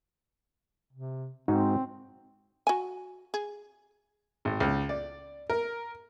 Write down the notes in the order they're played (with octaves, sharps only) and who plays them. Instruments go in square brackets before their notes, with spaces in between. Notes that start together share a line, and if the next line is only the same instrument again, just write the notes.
[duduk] C3
[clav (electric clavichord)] G#2 D#4 F#4 [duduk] C4
[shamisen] F#4 G#5
G#4
[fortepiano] G#1
C#2
D5
A#4